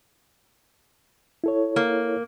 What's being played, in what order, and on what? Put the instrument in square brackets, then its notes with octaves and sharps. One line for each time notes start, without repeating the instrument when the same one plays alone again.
[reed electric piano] E4 A4 C#5
[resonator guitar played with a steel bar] A#3